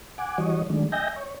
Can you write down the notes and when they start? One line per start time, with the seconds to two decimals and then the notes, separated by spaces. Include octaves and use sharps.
0.18 F#5 G#5 D6
0.38 E3 G3 F#4 C#5 D#5
0.70 D#3 F#3 G#3 A3 D4
0.92 D#5 E5 G5 G#5 G6 A#6
1.16 C#5